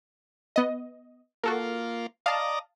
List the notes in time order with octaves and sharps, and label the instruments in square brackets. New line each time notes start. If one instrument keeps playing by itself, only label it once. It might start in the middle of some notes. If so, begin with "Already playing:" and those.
[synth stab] B3 D#5
[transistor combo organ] A#3 F4 [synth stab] F#4 A4 A#4
[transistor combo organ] D5 D#5 A#5 [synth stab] F5 A5